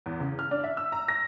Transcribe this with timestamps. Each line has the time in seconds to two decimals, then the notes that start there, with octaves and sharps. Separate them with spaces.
0.06 E2
0.20 C#3
0.39 F6
0.51 D4
0.64 E5
0.77 E6
0.92 A#5
1.08 A#6